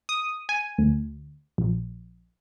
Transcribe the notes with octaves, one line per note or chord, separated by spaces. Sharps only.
D#6
G#5
D2
A#1